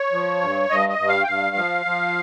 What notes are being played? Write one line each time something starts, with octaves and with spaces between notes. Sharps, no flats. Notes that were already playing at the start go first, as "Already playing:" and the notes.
Already playing: C#5
F3
G2
G2 D#5
D#5
G2
F5
G5
G2 F5
F3
F3